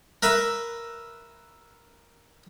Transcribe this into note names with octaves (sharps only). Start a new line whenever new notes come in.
A#4 B4 E5